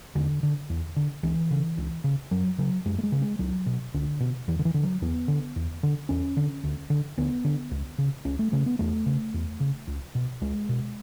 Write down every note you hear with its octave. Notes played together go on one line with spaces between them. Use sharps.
E2 D3
D3
E2
D3
C#2 E3
C#3
C#2
C#3
F#2 F#3
C#3 F#3
F#2 G#3
A3
G#3
C#3
G#3
C#2 F#3
B2
C#2 D3
B2
E2 E3
D3
E3
D3
F#3
E2 B3
D3
E2
D3
E2 C#4
D3
D2
D3
D2 B3
D3
C#2
C#3
C#2 C#4
A3
C#3 A3
B3
E2 A3
C#3
E2
C#3
C#2
B2
C#2 G#3
B2